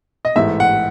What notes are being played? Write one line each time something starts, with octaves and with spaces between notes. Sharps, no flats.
D#5
A1 G#2 E3 A3 E5
F#5